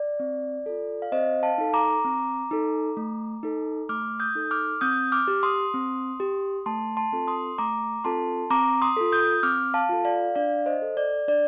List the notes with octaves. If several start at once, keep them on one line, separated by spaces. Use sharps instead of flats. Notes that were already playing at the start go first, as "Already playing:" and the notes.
Already playing: D5
C4
F4 A4
F5
C4 C5 D#5
F5 A5
D#4 A4
A#5 D6
C4
D#4 A4
A3
D#4 A4
A3 D6 F6
D#6 G6
D#4 A4
D6 F6
C4 D#6 G6
D6 F6
G4
C6 D#6
C4
G4
A3 A5 C6
A5 C6
C4 F4 A4
C6 D#6
A3 A#5 D6
C4 F4 A4 A5 C6
C4 A#5 D6
C6 D#6
F4 A4
D#6 G6
C4 D6 F6
F5 A5
F4 A4
D5 F5
D4 D5 F5
C5 D#5
A4
D5
D4 D5